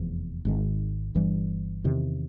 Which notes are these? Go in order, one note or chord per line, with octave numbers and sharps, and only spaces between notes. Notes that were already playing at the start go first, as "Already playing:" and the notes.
Already playing: F1 E2 F3
G#1 G#2 D#3
G1 G2 E3 G3
E2 C3 D#3